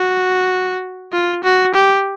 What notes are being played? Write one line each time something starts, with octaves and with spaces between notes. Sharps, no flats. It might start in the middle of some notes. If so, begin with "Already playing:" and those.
Already playing: F#4
F4
F#4
G4